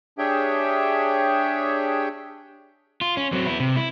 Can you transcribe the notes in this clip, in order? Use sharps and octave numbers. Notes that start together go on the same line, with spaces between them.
D4 G4 G#4 C#5 E5 G5
F4
C#4
F#3 C4
B3 E4
C3
E4